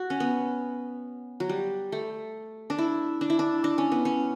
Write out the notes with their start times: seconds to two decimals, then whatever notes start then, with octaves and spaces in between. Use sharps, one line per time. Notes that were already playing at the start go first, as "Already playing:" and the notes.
Already playing: F#4
0.10 C#4
0.20 B3
1.40 F#3
1.49 G3
1.92 A3
2.70 D4
2.78 E4
3.21 D4
3.30 E4
3.39 D4
3.64 D4
3.78 C#4
3.92 B3
4.05 C#4